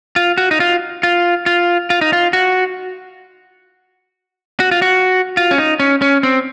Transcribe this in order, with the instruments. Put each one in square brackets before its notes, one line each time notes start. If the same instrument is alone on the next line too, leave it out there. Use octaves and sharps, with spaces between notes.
[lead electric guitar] F4
F#4
D#4
F4
F4
F4
F4
D#4
F4
F#4
F#4
F4
F#4
F4
C#4
D#4
C#4
C#4
C4